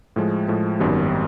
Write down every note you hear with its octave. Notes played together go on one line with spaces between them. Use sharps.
A2 F3 G#3
A2 F3 G#3
G#1 F#2 D#3 G3 B3